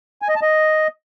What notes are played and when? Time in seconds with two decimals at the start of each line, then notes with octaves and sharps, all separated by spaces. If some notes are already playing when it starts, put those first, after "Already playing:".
0.22 G#5
0.29 D#5
0.36 A5
0.42 D#5